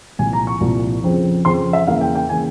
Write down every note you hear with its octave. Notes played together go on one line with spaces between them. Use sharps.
C2 A#2 F3 G#5
A#5
C#6
C2 A#2 F3
F2 C#3 F3 C4
F2 C#3 F3 C4 C6
E5
E2 C#3 E3 A#3 F5
G5
G5
C#3 E3 A#3 G#5